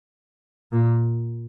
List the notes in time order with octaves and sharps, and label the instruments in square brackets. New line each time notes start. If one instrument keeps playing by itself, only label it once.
[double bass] A#2